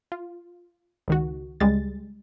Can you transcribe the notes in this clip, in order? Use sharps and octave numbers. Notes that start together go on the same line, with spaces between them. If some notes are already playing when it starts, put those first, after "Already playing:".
F4
C#2 D#3 F#4
C#2 G3 G#3 A6